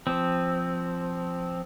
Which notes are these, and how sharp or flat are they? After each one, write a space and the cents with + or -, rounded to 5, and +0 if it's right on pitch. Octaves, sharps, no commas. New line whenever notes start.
F3 +0 C4 +0